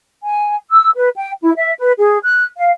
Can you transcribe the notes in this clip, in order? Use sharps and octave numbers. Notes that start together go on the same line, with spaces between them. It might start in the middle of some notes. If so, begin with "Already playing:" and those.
G#5
E6
B4
G5
E4
E5
B4
G#4
F#6
F5